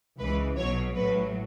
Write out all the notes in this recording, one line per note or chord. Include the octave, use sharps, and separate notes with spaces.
C#2 C#3 E3 B4
B1 B2 F#3 C#5
A1 A2 F#3 B4